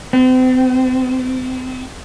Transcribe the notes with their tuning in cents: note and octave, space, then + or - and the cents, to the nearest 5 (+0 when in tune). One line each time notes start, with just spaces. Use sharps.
C4 -35